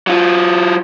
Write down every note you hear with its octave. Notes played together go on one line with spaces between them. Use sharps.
F#3 F4